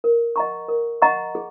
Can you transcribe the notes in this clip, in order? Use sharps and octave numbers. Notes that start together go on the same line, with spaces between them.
A#4
D#5 F#5 A#5 C#6
A#4
D#5 F#5 A#5 C#6
G#4